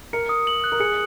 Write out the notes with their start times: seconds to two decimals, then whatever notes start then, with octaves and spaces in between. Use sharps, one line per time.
0.13 A#4 C#7
0.29 D#6
0.47 F#7
0.64 F#6
0.72 A#4
0.80 G#4 C#7